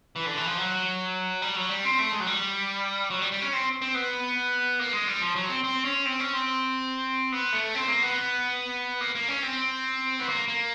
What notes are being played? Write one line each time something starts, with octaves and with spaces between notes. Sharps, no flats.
E3
D3
E3
F3
F#3
G3
F#3
G3
C4
A3
G#3
F#3
G3
F#3
G3
G3
C#4
C4
C4
B3
A#3
G#3
G3
F3
F#3
C4
C4
C#4
C4
C#4
C4
B3
A3
C4
A#3
B3
A#3
A#3
C#4
C4
B3
A#3
A#3